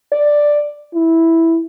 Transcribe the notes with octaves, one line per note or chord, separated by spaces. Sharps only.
D5
E4